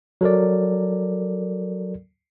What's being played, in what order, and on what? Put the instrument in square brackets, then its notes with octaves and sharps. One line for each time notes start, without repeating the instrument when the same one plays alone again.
[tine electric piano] F#3 A4 A#4 D5